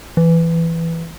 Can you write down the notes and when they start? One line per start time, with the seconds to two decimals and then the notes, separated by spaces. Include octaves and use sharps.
0.17 E3